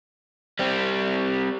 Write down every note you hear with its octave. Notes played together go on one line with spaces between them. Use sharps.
G3 C4